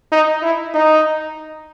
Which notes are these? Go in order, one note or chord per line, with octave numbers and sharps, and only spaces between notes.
D#4
E4
D#4